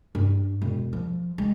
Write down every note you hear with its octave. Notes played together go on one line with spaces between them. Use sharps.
G2
E1
F3
G#3